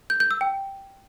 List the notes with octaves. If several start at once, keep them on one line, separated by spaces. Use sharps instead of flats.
G6
G6
E6
G5